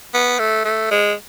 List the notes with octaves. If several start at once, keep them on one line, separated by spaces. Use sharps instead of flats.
B3
A3
A3
G#3